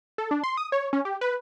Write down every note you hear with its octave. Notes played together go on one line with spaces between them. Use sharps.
A4
D4
C6
D#6
C#5
C#4
G4
B4